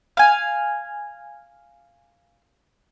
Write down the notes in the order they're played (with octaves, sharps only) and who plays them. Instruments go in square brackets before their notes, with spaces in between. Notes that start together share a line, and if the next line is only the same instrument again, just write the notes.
[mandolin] F5 G#5